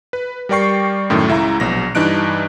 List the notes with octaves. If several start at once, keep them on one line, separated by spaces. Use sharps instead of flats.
B4
G3 A#4 D5 G5 C#6 C7
F#2 A2 D#3 A3
C#2 E4 E5 A#5
A#1 B2 F#3 A#6
G2 E3 D4 D#4 F#6 D7